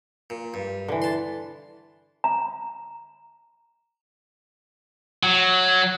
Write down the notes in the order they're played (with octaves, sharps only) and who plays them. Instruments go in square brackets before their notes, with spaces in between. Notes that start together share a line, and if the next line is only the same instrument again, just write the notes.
[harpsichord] A#2
G2
[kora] D3 E3
[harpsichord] A5 C6
[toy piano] A#5
[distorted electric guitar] F#3